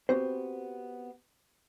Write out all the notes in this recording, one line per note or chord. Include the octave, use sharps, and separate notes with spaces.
B3 C4 F#4 G4 C5